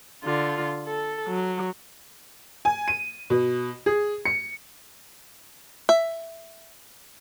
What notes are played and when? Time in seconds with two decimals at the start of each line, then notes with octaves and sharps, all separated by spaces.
0.24 D3 F4
0.87 A4
1.28 F#3
2.65 G#5
2.88 D#7
3.30 B2
3.86 G#4
4.25 C#7
5.89 E5